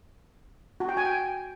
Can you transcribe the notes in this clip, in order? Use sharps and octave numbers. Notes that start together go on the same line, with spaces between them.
F#4
G5
G#5
G5